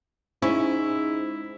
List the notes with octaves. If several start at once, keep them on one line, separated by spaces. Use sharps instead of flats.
G#2 C#4 E4 C5